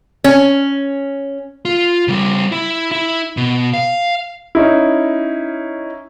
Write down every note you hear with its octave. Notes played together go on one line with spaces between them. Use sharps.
C#4
F4
C#3 G3
E4
E4
B2
F5
C#4 D#4 E4